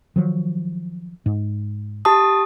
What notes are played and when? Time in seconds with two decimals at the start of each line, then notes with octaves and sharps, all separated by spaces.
0.16 D#3 F3 F#3
1.26 G#2
2.05 G4 A5 D#6